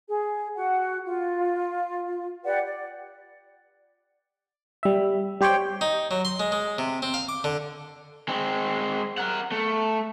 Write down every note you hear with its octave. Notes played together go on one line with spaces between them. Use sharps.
G#4
F#4 F#5
F4
G4 B4 D5 F#5
D5
G3 E5
G3 G4 C5 C#5 G5
D#4
F#3
C6
G#3
G#3
C3
C4
F5
D6
D3
G#3 C4
A#4 F#5
A3